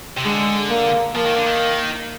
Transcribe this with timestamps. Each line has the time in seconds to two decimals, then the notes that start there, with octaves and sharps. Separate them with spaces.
0.17 C3
0.25 D3 G#3
0.70 A#3
1.15 F3 A#3
1.26 D#3
1.36 D3
1.46 D#3